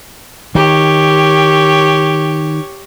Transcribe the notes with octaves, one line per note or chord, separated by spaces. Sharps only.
D#3 G4 C#5